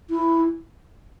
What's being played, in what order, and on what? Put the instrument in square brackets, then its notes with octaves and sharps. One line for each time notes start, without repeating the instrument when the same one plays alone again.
[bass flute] E4